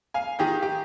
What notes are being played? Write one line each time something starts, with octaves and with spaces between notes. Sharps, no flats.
F5 G#5
D#3 G4 G#4 G5
G4